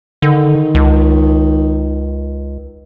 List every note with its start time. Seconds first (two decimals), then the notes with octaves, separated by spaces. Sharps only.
0.22 D3 D#3
0.75 C#2